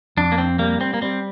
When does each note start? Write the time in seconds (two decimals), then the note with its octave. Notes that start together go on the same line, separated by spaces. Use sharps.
0.17 F2 D4
0.32 A#3
0.38 C4
0.59 G3 A#3
0.81 C4
0.94 A#3
1.02 G3 C4